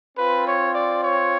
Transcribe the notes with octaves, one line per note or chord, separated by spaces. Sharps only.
C4 F4 B4
C#5
D5
C#5